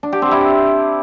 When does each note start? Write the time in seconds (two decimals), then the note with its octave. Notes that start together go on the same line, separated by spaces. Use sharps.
0.03 D4
0.12 G4
0.22 C4
0.31 E4